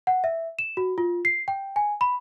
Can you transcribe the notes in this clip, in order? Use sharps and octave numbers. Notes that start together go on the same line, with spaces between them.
F#5
E5
E7
F#4
F4
C7
G5
G#5
B5